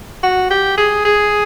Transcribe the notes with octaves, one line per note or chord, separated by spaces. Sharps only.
F#4
G4
G#4
G#4